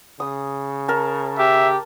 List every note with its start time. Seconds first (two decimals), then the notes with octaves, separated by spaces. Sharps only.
0.20 C#3 D#6
0.88 A#4 A5
1.39 G4 E5